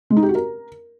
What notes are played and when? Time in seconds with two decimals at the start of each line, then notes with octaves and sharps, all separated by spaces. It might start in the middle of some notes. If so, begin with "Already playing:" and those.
0.10 G#3
0.17 D#4
0.23 G4
0.29 F#4
0.35 A#4